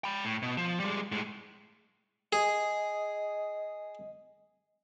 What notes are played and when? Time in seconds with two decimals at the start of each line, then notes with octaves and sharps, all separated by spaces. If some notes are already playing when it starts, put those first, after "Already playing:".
0.04 G5 B5
0.24 A2
0.42 B2
0.57 F3
0.80 G3 G#3
1.12 A2 G#3
2.33 G#4 D#5